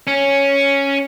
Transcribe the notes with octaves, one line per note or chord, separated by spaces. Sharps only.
C#4